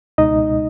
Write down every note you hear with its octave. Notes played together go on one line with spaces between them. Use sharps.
C#2 B2 G#3 D#4 D#5